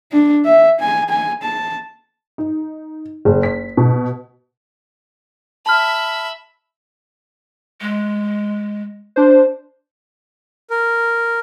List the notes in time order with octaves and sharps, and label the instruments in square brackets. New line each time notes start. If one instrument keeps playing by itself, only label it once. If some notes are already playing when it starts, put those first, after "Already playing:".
[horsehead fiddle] D4
E5
G#5
G#5
A5
[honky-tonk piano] D#4
F#1
B6
B2
[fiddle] E5 B5 [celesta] A5 F6
[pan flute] G#3
[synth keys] D4 C5
[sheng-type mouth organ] A#4